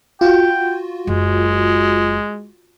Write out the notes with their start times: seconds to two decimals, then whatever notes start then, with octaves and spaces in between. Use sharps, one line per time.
0.21 F4 F#4 G5
1.07 F#1 G#3